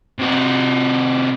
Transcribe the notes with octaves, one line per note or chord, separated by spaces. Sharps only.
C3 F#4